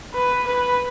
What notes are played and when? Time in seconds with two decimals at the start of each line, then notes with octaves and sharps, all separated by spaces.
0.14 B4
0.47 B4